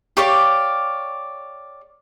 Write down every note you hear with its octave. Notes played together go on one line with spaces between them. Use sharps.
G4 C#5 D5 F5